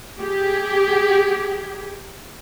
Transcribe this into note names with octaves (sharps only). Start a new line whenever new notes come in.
G4 G#4